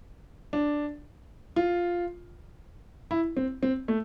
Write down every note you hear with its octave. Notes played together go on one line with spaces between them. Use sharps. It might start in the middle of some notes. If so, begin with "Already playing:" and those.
D4
F4
E4
C4
C4
A3